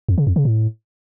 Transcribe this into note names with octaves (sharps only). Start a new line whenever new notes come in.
F2
C#3
F2
C#3
A2